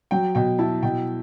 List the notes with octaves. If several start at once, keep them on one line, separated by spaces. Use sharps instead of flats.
F#3 G5
B2 G5
E4 A5
B2 G5